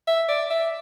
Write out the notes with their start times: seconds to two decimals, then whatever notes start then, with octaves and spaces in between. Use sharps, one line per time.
0.07 E5
0.29 D5
0.50 E5